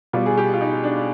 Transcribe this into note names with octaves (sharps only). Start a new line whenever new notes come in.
B2 G3 F4
G#4
G4
F4
D#4
D4